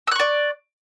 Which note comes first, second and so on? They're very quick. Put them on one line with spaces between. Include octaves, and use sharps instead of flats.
E6 F#6 C#6 D5